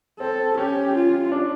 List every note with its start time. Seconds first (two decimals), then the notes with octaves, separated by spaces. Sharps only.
0.20 C4 A4
0.57 C#4 G4
0.94 F4
1.32 D4